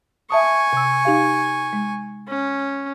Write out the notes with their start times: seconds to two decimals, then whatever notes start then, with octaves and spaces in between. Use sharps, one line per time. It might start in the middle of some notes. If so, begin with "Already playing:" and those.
0.31 E5 G#5 A5 C#6 D#6
0.73 C3 E6
1.05 D#4 G4 F5
1.73 G#3
2.28 C#4